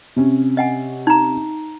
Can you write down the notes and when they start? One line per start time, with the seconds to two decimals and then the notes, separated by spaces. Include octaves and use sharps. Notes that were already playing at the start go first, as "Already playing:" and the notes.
0.16 C3 C#4
0.57 D#5 F#5 G#5
1.07 D#4 A#5